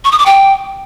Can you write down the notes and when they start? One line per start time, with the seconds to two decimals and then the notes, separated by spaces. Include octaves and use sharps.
0.05 C#6
0.12 D#6
0.19 D6
0.26 G5